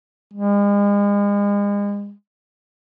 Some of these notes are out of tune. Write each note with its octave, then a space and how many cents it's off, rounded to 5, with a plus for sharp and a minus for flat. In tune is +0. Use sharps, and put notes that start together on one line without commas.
G#3 -40